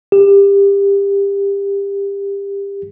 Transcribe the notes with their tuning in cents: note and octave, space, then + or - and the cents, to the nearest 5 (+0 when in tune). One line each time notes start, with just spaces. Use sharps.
G4 +25